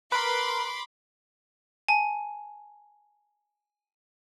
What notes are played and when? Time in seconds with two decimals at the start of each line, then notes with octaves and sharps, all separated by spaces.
0.12 A#4 B4 B5 C6 D6
1.89 G#5 A5